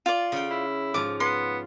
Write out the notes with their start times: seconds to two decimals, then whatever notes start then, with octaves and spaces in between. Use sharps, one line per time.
0.06 F4 D5
0.32 C#3 F#5 G5
0.50 E4
0.94 G#2 F3 D6
1.20 B3 C6